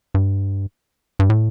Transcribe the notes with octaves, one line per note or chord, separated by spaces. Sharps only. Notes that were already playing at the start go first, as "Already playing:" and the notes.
G2
G2
A2